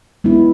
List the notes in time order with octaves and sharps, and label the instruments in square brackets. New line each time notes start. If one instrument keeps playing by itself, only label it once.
[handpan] G#3 B3 E4